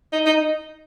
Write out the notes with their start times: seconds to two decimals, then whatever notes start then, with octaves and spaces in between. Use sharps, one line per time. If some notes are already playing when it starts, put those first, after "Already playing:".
0.13 D#4
0.26 D#4